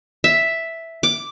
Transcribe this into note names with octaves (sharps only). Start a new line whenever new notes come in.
E5
D6